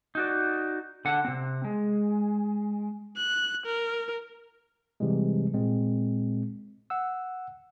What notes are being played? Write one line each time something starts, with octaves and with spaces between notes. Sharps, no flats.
D#4 F#4 D5
D3 F#5
C3 C4
G#3
F#6
A#4
C3 E3 G3 G#3
A#2 G#3 C4
F#5 E6